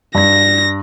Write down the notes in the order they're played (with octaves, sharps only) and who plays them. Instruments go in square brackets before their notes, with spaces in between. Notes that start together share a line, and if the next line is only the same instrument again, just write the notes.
[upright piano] G2 [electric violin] A#6